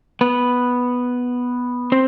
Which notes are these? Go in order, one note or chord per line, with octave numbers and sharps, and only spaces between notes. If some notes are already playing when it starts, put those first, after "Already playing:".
B3 B4
C4 C5